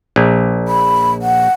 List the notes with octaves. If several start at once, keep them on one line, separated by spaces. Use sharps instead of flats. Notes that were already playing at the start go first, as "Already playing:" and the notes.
A#1
B5
F#5